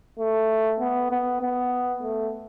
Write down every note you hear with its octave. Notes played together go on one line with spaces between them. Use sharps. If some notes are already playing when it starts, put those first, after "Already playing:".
A3
B3
B3
B3
A3